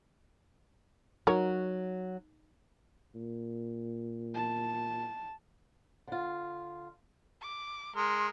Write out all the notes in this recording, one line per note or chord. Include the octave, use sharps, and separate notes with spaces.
F#3 D#4 F#4 A#4 C#5
A#2
A5
D3 F4
D6
G#3 A#4 C6